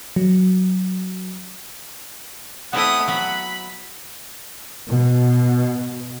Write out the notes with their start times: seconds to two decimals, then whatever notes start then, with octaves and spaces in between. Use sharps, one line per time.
0.16 F#3
2.73 A3 B3 C4 E4 F#5 D#6
3.08 F#3 B3 B5
4.88 B2